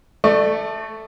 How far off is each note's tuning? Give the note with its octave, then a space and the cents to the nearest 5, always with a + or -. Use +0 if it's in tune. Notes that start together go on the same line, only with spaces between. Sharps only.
A3 +0 D5 +35 C#6 +0